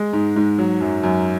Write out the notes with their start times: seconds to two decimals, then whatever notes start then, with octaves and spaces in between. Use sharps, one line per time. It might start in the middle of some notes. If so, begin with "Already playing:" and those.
Already playing: G#3
0.13 G#2
0.36 G#2
0.58 F#3
0.81 F#2
1.03 F#2